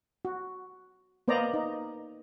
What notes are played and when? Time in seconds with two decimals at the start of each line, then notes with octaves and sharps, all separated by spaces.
0.25 F#4
1.28 A#3 B3 C5 D5 D#5 A#5
1.54 D#4